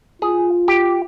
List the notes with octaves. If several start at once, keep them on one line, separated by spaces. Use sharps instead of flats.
F4 G#4
G4